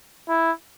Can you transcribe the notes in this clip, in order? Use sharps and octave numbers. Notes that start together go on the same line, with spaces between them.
E4